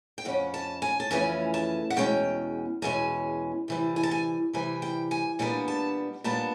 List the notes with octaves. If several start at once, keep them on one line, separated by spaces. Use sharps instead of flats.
G5
F2 C#3 C#4 F#5
A5
G#5
A5
F2 C#3 E3 A3 C#4 G#5
A5
F#5
E2 B2 G#3 C#4 G5
E2 B2 G#3 C#4 G#5
C3 E3 G3
G#5
A5
G#5
C3 E3 G3 G#5
G5
G#5
A#2 G3 B3 D4 G#5
A5
A#2 G3 B3 D4 A5